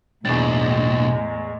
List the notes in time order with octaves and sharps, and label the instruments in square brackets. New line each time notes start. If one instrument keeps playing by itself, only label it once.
[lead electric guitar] B1 D4 [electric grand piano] E2 A6 [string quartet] A2 G#3